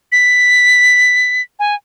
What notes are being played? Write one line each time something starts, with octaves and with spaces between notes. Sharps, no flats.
B6
G#5